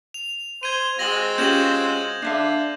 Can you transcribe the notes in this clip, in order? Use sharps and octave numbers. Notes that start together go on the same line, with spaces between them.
F7
C5 G#6 D#7
G#3 C4 F#4 A#6 F#7
C#4 F4 G4 G6 E7 F#7
D3 D4 E5 F5